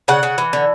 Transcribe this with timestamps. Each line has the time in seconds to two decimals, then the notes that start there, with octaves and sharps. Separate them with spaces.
0.08 C#3 F#5
0.23 C#3
0.38 E3
0.53 D3